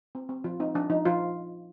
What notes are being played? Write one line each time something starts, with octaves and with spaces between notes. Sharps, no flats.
C4
C4
F3 F4
C4 D#4
F3 D4
F3 D#4
F3 F4